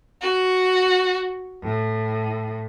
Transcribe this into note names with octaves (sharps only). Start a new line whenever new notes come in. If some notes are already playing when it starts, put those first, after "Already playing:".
F#4
A2